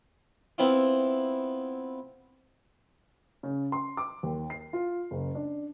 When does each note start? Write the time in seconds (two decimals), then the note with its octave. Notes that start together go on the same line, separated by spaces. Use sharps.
0.58 B3 C4 E4 F4
3.43 C#3
3.72 C6
3.97 D6
4.23 D#2
4.50 C7
4.73 F4
5.11 F#1
5.35 D4